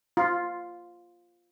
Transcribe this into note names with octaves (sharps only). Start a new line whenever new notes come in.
F4